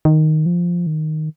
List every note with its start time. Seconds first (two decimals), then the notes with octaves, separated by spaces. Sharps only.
0.05 D#3
0.46 F3
0.87 D#3